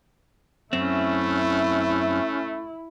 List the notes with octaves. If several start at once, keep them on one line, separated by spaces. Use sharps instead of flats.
F#2 A3 C4 C#4 E4